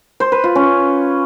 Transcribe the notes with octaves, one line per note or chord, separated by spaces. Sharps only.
C5
B4
F4
C#4